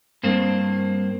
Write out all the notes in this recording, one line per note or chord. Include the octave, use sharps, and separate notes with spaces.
G2 A#3 C4